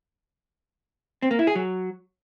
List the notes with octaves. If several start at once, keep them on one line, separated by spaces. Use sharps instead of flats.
C4
A#3
E4
G#4
F#3